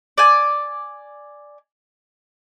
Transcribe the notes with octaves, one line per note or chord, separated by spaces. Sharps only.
D5 G#5